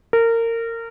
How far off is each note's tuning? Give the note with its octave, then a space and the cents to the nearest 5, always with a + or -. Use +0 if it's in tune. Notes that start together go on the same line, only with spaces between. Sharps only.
A#4 -25